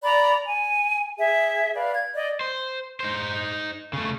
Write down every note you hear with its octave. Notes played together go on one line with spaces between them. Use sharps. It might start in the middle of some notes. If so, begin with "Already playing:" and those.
D5 A#5 B5
G#5
G#4 E5
B4 D5 F5
G#6
D5 D#5
C5
D#4 C5
C#3 A3